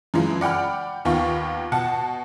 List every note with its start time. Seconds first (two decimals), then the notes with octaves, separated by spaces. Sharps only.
0.14 F#2 C#3 E3 F3 G#3
0.41 D5 F#5 G5 B5 F6
1.05 D#2 D#3 B3 F4 F5 C#6
1.72 B2 F#5 A5